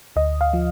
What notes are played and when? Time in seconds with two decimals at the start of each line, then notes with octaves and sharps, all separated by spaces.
0.16 D2 D#5
0.41 F5
0.53 F3